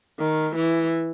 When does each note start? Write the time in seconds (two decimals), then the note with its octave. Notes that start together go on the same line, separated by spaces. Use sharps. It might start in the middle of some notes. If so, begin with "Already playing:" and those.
0.19 D#3
0.56 E3